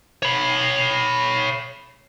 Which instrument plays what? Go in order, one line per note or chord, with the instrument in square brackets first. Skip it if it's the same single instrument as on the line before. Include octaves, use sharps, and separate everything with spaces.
[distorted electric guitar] C#5 B5